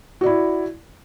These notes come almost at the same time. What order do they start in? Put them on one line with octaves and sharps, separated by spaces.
F#4 D5 E4